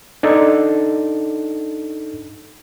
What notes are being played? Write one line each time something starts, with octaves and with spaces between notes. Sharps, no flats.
D4 D#4 A4